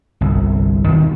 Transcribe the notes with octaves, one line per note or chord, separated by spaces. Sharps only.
G1 C2
D#1 D#3 C4